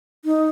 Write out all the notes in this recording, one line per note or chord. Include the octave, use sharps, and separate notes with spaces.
D#4